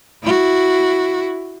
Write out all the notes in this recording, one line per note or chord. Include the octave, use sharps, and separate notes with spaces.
E4 F#4